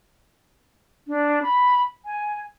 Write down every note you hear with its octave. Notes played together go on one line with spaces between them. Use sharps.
D4
B5
G#5